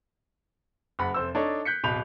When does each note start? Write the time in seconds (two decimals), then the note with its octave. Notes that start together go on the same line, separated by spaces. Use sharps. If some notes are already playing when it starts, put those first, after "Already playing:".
0.99 F#1 F#5 B5
1.14 F1 C5 E6
1.35 D4 D#4 A4 C#5
1.65 F#6 G6 B6 C#7
1.84 D1 B2 B5 G6 F7